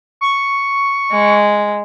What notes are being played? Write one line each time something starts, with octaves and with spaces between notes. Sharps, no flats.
C#6
G#3